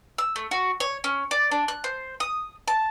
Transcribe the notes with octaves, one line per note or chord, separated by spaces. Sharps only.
E6
A3
F#4
C#5
C#4
D5
D4
F#6
C5
D#6
A5